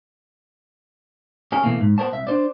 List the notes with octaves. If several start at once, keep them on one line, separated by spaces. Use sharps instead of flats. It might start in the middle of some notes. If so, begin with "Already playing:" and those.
C#4 G#4 A#4
B2 E3 A3 A#3
G#2
B3 A#4 C5 C#5 A5
C2 E5
D4 C5 D5